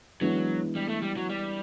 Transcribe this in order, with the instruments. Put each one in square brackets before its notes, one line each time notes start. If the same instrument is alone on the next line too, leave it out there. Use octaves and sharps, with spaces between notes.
[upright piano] E3 G#3 B3 D4 [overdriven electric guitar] F#3
[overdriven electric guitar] G3
A3
G3
F#3
G3